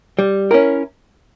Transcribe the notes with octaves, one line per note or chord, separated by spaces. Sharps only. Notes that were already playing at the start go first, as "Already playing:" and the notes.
G3
C#4 E4 A#4